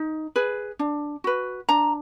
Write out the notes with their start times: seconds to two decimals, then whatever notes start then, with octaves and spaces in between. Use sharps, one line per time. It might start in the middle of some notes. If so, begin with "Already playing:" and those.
Already playing: D#4
0.36 G#4 B4
0.79 D4
1.24 F#4 B4
1.69 D4 A#5